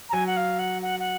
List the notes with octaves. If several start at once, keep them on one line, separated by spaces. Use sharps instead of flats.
A#5
F#3 G#5
F#5
F5
F#5
F#5
F#5